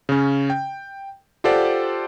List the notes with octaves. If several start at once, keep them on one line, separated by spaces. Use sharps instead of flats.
C#3 C#4
G5
F4 G4 A4 C5 D5 F#5